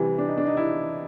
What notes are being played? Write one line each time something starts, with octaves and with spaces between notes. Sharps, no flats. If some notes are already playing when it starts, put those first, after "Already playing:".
Already playing: C3 E3 G3
D4
D#4
D4
D#4
E4